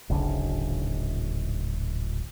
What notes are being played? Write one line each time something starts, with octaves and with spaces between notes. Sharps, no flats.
D1 G#1 C#3 D4